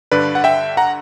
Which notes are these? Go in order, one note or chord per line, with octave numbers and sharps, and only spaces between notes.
G2 D3 B4 D5
F#5
E5 G5
F#5 A#5